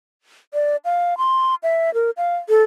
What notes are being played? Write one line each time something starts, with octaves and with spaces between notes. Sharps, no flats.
D5
F5
C6
E5
A#4
F5
A4